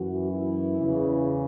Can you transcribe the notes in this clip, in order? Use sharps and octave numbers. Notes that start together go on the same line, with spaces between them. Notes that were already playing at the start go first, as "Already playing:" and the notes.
Already playing: F#2 E3 F#4
E4
E2 C#3 E3